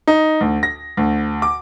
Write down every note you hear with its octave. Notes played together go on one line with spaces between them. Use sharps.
D#4
D2
A#6
D2
D6